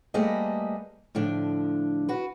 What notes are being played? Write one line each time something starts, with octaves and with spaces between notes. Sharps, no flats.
G3 A3 A#3 G#4 B4 D#5
A2 D3 F3 D4
F#4 B4